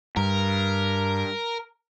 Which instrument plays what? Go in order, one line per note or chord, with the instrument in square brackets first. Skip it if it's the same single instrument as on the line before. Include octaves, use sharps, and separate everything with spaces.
[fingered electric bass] G2 [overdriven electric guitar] A#4